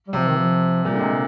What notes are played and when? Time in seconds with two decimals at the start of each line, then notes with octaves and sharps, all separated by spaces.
0.08 G3
0.13 C3 F3
0.28 D#3
0.38 F3
0.84 A#2 G3
0.94 D3
1.00 C3 G#3